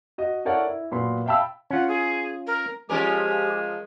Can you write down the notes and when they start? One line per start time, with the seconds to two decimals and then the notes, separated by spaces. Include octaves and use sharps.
0.18 F#4 D#5
0.45 E4 A4 A#4 C#5 D5 F#5
0.67 E4
0.92 A#2 F#3 B3 B5 C6
1.26 E5 F5 G5 A5 B5 E6
1.71 C#4 F4 F#5
1.88 G#4
2.47 A#4
2.89 F3 G#3 C#4 G4 A#4 G#5